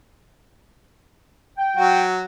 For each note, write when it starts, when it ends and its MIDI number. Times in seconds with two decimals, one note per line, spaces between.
1.57 2.02 79
1.77 2.25 54
1.77 2.25 66